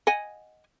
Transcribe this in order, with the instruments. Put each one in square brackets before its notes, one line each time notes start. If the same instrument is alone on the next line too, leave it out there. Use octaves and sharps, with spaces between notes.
[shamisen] D#5 F#5 G#5